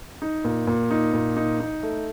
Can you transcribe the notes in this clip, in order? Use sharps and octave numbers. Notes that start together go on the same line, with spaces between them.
D#4
A#2
A#2
D#4
A#2
D#4
D#4
A3